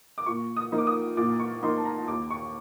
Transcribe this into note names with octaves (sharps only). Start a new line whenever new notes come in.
D6
A#2 C#6
D#6
F3 A#3 D#4
D6
D#6
A#2 D6
C#6
F3 A#3 D#4 C6
A5
A#5
D#2 D6
C#6